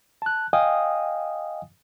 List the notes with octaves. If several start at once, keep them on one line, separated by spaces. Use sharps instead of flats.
A5 F#6
D#5 F5 G5 G#5 D#6